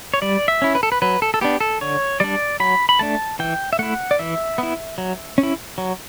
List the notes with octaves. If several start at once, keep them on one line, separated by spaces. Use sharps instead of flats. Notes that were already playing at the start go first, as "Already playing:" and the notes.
C#5
G3 D5
E5
C#4 E4
B4
A4
B4
F#3 B4
A4
A4
B3 D4 G4
A4
D3 C#5
G3 D4 D5
F#3 B5
B5
A3 D4 A5
E3 G5
E5
A3 E4 F#5
D5
E3 E5
B3 E4
F#3
C#4
E4
F#3